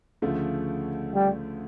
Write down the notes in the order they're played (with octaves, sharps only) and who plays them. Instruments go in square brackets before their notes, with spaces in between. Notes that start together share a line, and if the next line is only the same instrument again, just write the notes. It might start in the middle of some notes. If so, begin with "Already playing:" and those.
[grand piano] D2 C#3 F3 A3
[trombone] G3